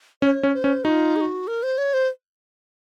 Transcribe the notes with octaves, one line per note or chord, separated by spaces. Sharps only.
C#4 C#5
C#4
C5
C#4
D#4 F4 F#4
G#4
F#4
A#4
C5
C#5
C5